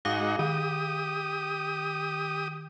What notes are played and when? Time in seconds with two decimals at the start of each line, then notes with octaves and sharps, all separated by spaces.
0.05 G#2 D#4 F#4 F5 D6
0.39 D#3 G4 D#6